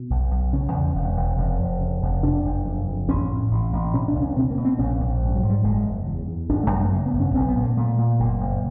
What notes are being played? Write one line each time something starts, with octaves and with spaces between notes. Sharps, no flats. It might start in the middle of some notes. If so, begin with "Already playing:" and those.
Already playing: B2
B1
B1
C#3 C#4
E2
E1
E1
F1
F1
C#3
F1
C3 D4
F#1
F2
F2
A1 C#4
A2
A1
A1
B2 C#4
D4
C#2
C#4
B2 C4
A#3
B2
C4
A#1 C#4
A#1
G#2
F#3
G#2
G3
F#1 G#3
E2
E2
E2
G#1 D4
A3
F#2
G#3
C#3 A#3
B3
G#1
C#4
B1 C4
B3
A#2
A#3
A#2 A3
A#2
F#1 A#3
F#1